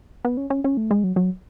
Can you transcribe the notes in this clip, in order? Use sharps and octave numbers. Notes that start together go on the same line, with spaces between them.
B3
C#4
C#4
C#4
A3
G#3
F#3
F#3